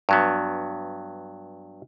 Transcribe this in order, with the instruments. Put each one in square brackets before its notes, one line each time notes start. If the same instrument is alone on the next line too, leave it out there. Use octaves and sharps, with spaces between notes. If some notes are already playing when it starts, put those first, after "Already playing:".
[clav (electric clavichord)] G2 F#3 B3